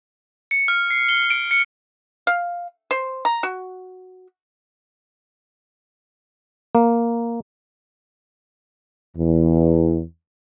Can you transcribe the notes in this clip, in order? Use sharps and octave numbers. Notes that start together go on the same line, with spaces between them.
C#7
F6
C7
G7
D7
C#7
F5
C5
A#5
F#4
A#3
E2